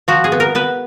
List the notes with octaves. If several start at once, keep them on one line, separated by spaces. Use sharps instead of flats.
F3 F#4
G#4
B3
A#4
B3 B4